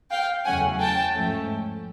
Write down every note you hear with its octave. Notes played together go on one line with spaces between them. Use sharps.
F5 G5
E2 C#3 F#3 A3 C#4 F#5 G#5
G5 A5
G#2 F3 A3 C#4